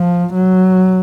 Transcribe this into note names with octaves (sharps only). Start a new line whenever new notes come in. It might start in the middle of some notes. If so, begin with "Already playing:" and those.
Already playing: F3
F#3